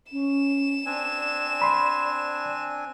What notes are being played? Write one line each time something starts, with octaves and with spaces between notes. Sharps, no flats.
C#4 E7
C4 D4 D5 G#5
B5 C6